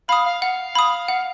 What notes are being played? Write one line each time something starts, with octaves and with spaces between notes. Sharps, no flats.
F5 B5 D#6
F5
F5 F#5
B5 D#6
F#5